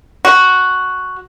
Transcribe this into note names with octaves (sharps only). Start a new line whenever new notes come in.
F#4